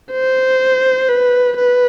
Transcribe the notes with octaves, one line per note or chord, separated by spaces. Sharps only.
C5
B4
B4